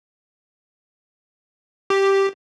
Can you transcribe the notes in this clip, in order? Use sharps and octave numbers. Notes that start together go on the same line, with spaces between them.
G4